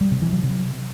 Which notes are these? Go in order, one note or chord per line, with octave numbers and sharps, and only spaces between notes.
G3
C3
E3
F#3
C3